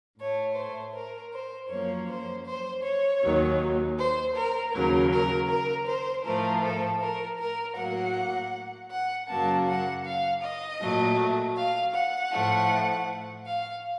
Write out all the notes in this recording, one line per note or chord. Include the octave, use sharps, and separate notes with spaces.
A2 A3 C#5
C5
A#4
C5
F#2 F3 A#3 C#5
C5
C5
C#5
D#2 D#3 F#3
C5
A#4
D#2 C#3 F#3 A#4
A#4
A#4
C5
A2 F3 A3 A#4
A4
A#4
A#4
A2 F#3 A#3 F#5
F#5
F#2 C#3 F#3 A#3 A5
F#5
F5
D#5
A#2 F#3 A3
F5
F#5
A2 F3 A3
F5